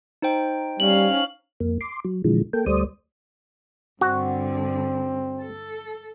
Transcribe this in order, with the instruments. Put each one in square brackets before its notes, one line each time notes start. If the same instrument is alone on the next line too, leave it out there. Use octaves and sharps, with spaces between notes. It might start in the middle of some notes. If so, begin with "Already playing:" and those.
[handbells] D#4 C5 G5
[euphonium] G3 [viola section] C#4 F5 [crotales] F#7
[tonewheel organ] F2 A#3
C6 D6
F#3
A#2 D3 E3 F3 G#3
A#3 A4 G5
D2 G3 A3 C5 D5 D#6
[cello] G2 D3 [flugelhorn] C4 [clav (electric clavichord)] F#4
[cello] A4